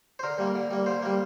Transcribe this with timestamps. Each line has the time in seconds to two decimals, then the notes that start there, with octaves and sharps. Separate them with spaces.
0.19 C5
0.23 D3 A#4
0.38 G3 A#3
0.56 D3
0.71 G3 A#3
0.86 D3 C5
1.02 G3 A#3